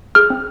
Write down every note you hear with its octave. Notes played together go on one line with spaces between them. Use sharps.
G#4 F6
C4